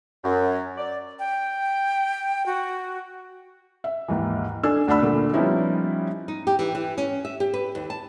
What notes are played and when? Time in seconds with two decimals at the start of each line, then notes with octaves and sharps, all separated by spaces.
0.23 F#2
0.77 D5
1.19 G5
2.46 F#4
3.84 E5
4.08 D#2 G#2 E3
4.63 D4 A4 G#5 E6
4.88 D2 D4 D5 A5 B5 E6
5.02 A#2 D3 A3
5.33 F3 G3 B3 C#4 D#4 E4
6.28 D#4
6.47 G4
6.59 E3
6.75 E3
6.98 C#4
7.25 E5
7.40 G4
7.54 B4
7.75 D#2
7.90 A5